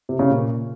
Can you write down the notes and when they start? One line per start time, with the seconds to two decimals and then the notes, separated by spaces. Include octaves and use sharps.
0.09 C3
0.19 C#3
0.30 A#2